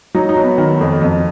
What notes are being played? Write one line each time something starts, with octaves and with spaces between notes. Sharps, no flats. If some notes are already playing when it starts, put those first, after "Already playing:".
F#3 D#4
D#4
F#3
B3
D#3
F2
F2